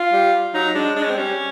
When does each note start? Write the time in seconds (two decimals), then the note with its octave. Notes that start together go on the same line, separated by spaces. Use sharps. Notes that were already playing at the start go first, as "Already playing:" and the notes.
Already playing: F4
0.13 G3
0.54 F#3 D#4
0.74 G#3 D4
0.96 G#3 D4
1.03 C#4
1.10 C4
1.17 G3 C#4